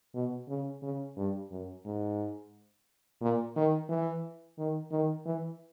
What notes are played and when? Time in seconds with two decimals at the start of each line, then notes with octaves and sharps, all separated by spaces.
0.15 B2
0.49 C#3
0.83 C#3
1.17 G2
1.51 F#2
1.85 G#2
3.21 A#2
3.56 D#3
3.89 E3
4.58 D#3
4.91 D#3
5.25 E3